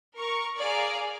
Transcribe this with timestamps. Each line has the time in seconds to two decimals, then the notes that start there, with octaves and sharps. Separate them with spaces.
0.17 A#4 C#6
0.58 G#4 D5 F5 A#5 D6